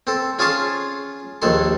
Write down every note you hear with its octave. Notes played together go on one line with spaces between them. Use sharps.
C4 A4
C#4 F4 G#4 C#5 A5 C6
A#1 D#2 D#3 A4 C6